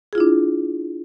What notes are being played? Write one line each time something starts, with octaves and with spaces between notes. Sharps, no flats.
D4 E4 F4 G#4